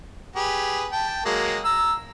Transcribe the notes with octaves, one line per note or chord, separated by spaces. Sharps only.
G4 G#4 B4
G5 A5
F#3 G#3 A#3
A#5 E6